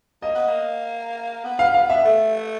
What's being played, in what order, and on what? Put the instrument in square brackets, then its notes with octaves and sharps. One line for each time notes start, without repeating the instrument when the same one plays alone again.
[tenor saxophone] A#3 [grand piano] D#5
[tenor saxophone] B3
A#3
B3
[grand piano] F5
F5
E5
[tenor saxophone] A3